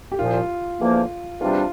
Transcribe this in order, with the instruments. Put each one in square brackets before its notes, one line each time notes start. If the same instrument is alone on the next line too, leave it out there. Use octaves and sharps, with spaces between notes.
[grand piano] G4
[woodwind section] C2 A#2 F3 [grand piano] F4
[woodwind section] E2 D3 F3 A#3
[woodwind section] E2 C3 G3 D4 [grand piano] F4